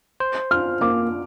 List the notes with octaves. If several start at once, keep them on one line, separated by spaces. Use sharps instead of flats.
C5
F4 F6
A#3 D6